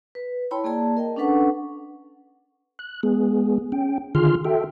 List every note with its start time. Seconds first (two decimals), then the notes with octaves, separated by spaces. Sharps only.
0.15 B4
0.51 E4 C#5 G5 A5 B5 C6
0.64 A#3 G#4 D5 A5
0.97 A#4 D#5 G5
1.16 C#4 D4 A4 B4 F#5 C#6
2.79 F#6
3.03 G#3 B3 G#4
3.72 C#4 G5
4.15 D3 D#3 F4 G#4 C6 F6
4.45 F#4 A4 E5 G5